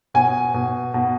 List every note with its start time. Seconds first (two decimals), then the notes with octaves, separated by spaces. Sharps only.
0.14 B2 G#5
0.54 B2
0.94 B2